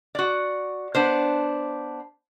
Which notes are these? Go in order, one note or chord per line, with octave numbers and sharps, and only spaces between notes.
F#4 D5
B3 D4 C5